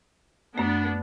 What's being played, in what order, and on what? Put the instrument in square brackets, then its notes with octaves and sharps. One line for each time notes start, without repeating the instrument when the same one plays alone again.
[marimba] F#2 A3 [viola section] B3 D4